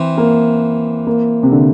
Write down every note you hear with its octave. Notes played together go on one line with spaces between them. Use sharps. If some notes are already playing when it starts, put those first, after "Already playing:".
Already playing: E3 C4
A#3
A#3
C3
D3